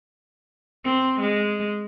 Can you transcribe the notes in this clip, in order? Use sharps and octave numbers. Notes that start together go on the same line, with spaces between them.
C4
G#3